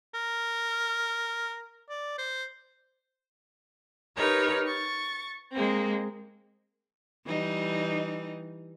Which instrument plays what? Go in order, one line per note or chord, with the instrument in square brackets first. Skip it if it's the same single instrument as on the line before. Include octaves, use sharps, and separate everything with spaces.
[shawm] A#4
D5
C5
[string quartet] D#4 G4 A#4 B4 C#5
C#6 A6
G#3 A#3 C4
[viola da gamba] E3 G3 D#4